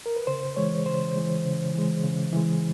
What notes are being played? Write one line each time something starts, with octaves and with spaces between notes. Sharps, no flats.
A#4
B4
C#3 C5
E3 G#3 C#5
C#3 C5
E3 G#3
C#3
E3 G#3
C#3
E3 G#3